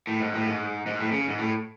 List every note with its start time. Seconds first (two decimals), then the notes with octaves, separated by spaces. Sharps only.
0.07 A2
0.20 G#2
0.34 A2
0.46 G#2
0.86 G#2
0.99 A2
1.12 C#3
1.28 G#2
1.38 A2